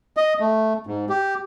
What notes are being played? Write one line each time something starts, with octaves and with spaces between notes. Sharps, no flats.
D#5
A3
G#2
G4